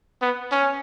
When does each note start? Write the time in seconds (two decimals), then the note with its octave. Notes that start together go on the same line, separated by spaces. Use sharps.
0.22 B3
0.52 C#4